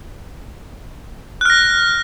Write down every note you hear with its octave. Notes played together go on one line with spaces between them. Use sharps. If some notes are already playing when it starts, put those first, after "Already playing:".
F6 F#6 A#6